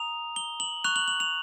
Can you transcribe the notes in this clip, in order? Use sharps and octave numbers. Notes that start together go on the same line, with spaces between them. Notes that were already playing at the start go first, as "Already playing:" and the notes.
Already playing: A#5 D#6 F7
G7
F#7
C#6 F#6 F7
F#7
F#7
F7